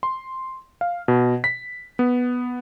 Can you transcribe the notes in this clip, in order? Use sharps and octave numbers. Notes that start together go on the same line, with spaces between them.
C6
F5
B2
B6
B3